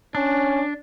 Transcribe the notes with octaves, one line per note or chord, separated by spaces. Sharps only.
C#4 D4